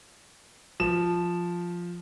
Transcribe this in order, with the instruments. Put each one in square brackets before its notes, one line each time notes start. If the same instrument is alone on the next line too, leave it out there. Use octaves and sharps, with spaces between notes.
[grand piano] F3 E7